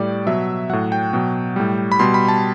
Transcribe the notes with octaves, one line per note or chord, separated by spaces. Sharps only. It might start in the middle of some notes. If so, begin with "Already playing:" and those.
Already playing: A2 G3 D5
B2 F#3 E5
A2 F#3 F#5
G5
B2 F#3
A2 G3
B5
B2 G3 C6
B5
A5